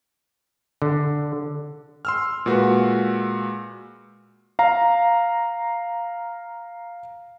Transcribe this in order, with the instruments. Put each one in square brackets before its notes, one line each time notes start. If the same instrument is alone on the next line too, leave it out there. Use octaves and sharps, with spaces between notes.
[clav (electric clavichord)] D3
[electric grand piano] C6 E6 F6
A#2 G#3 F#4 B4
F5 A#5